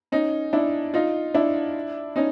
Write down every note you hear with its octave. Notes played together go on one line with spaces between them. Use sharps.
C#4 D#4
D4 E4
D#4 F4
D4 E4
C#4 D#4